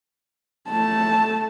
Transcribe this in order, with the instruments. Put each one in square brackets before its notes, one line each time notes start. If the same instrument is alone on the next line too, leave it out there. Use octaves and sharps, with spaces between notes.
[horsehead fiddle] A3 A5